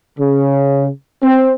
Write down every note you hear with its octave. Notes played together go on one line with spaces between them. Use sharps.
C#3
C4